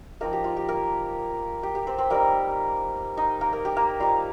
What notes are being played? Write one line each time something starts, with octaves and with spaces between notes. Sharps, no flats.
F3 A#3 C4 D#4 A#4
G4
F4
G4
A#3 A#4
G4
G4
C4 C5
C4 C5
G3 A#3 C4 D#4 A#4
D#4 D#5
A#3 A#4
A#3 A#4
G4
A#3 A#4
G3 C4 D#4 F4 F5